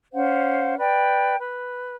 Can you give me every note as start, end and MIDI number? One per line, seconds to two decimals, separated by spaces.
0.13 0.75 61
0.13 0.75 72
0.13 0.75 77
0.13 0.75 78
0.78 1.36 71
0.78 1.36 74
0.78 1.36 79
1.40 1.96 71